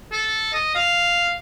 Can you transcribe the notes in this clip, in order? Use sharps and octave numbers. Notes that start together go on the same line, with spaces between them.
A4
D#5
F5